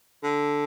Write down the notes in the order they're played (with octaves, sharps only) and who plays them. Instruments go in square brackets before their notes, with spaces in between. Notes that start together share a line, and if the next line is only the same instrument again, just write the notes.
[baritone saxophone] D3